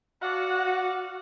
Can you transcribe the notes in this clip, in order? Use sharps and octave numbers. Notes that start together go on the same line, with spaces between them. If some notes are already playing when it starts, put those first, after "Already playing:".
F#4 D5 F5 F#5